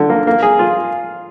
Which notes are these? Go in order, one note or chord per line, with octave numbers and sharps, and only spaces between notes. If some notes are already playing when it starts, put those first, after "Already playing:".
Already playing: D3
A#3
A#3
G#4
F4